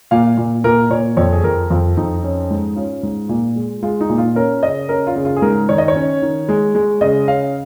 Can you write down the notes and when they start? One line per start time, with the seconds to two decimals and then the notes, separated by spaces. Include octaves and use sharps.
0.11 A#2 F5
0.37 A#2
0.64 A#2 A#4
0.90 A#2 C#5
1.17 F2 C#5
1.33 G#4
1.44 F2 A#4
1.70 F2 F4
1.97 F2 D#4
2.23 C#4
2.51 G#2
2.76 C#4 F4
3.03 G#2
3.29 A#2
3.56 G#3
3.83 G#3 F4
4.01 D#4
4.10 A#2
4.18 F4
4.36 C#4 A#4
4.62 C#3 D#5
4.89 C#4 A#4
5.07 F4
5.16 C#3
5.25 F4
5.36 G#4
5.42 G#2 A#4
5.69 D#3 C#5
5.78 D#5
5.88 C#5
5.95 C#4
6.22 D#3
6.49 G#3
6.75 G#3
7.01 C#3 D#5
7.28 C#4 F5